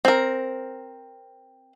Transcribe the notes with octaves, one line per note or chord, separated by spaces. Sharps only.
C4 A#4